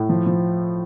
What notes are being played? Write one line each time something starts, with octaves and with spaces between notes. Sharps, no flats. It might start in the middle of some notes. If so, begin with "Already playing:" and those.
Already playing: A2
F3
F3